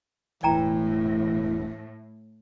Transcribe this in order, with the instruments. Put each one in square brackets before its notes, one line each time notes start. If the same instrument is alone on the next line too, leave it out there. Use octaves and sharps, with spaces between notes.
[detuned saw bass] E1 [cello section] A2 [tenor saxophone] E3 [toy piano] D5 G5 A#5